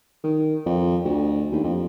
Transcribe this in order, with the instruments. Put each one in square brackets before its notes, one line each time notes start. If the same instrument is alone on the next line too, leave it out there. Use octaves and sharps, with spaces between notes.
[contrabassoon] D#3
F2
D2
D#2
F2